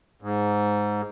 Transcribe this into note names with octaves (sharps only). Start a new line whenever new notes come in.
G#2